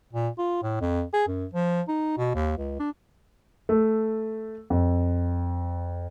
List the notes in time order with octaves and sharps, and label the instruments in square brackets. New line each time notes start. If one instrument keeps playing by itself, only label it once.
[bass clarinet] A#2
F4
A2
F2
G#4
F#2
F3
D#4
B2
D#2
C#2
D4
[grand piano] A3
F2